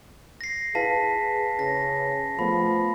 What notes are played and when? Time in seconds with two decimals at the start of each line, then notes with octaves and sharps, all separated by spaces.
0.41 A#6 C7
0.75 E4 G#4 B4 F5 A5 B6
1.59 C#3 A#6
2.39 F3 A3 B3 B5